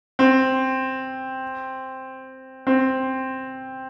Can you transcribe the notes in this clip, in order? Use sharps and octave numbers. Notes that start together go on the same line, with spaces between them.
C4
C4